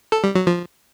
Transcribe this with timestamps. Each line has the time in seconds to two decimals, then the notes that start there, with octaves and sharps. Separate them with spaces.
0.12 A4
0.24 G3
0.35 F#3
0.47 F3